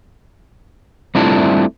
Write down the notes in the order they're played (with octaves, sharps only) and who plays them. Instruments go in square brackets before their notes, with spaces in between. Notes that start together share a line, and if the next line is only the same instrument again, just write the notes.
[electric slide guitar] G3 A3 C4 D4 E4 F4